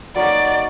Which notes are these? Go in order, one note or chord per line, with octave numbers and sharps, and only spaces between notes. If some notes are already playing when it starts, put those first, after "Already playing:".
F#3 A#3 D#4 F#4 D5